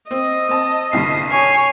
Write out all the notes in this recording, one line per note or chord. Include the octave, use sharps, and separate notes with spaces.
C4 D#5
C4 A5
C2 G2 D3 C7
C#5 G#5 C7